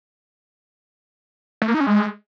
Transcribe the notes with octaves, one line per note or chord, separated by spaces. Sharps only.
A3
A#3
D#4
C#4
G#3